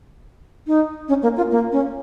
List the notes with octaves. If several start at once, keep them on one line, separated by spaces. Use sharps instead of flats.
D#4
C#4
A#3
F4
A#3
C#4